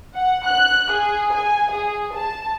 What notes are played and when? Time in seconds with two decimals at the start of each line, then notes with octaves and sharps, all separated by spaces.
0.14 F#5
0.46 F#6
0.91 G#4
1.35 G#5
1.72 G#4
2.14 A5